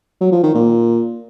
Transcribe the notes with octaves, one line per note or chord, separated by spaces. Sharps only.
F#3
F3
D#3
A#2